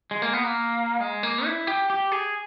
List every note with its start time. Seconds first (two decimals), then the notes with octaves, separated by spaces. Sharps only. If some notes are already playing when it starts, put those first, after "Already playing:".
0.11 G#3
0.22 A#3
0.33 B3
0.44 A#3
1.00 G#3
1.23 A#3
1.45 E4
1.67 G4
1.90 G4
2.12 G#4